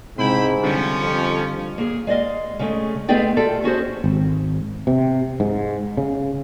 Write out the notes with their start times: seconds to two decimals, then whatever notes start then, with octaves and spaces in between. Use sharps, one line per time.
0.18 C#2 G#2 C3 E4 G5 B5
0.63 D3 F3 G3 C4 C#4
1.02 F2
1.78 A#3 G#4
2.07 G#3 D5 D#5 F5
2.59 C#3 G#3 A3
3.08 G#3 A3 B3 G#4 D5 G5
3.37 F4 G4 A4 D5 E5
3.64 C#4 F#4 G#4 C5
4.04 G#1
4.87 C3
5.40 G#2
5.97 C#3